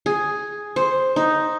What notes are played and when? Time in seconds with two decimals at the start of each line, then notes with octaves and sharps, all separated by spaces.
0.06 G#4
0.76 C5
1.16 D#4